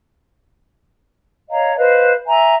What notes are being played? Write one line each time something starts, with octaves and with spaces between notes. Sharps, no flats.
C#5 D#5 F5 A#5
B4 C5 D#5 F5
E5 G#5 A#5